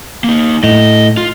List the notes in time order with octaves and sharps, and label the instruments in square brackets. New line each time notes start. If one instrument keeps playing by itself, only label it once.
[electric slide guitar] A#3 D#4
[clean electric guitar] A2 [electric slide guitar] D#5
[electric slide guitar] F4